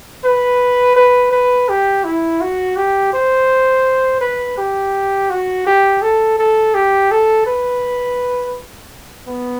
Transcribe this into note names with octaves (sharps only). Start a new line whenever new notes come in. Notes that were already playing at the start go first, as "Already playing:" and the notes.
B4
B4
B4
G4
E4
F#4
G4
C5
B4
G4
F#4
G4
A4
A4
G4
A4
B4
B3